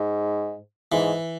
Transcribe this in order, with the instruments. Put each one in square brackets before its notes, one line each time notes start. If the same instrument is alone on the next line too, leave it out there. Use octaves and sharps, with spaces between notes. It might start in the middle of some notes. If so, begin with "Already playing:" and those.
Already playing: [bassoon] G#2
[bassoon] G#2 [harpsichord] E3